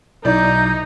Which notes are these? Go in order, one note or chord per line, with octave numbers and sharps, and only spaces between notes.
B1 D#4 E4 D5 G6